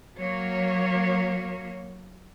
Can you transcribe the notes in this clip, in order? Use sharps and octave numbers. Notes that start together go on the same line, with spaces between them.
F#3 A#3 C#5